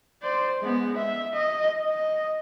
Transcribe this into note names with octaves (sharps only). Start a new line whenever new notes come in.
C5 D5
G#3 B3
E5
D#5
D#5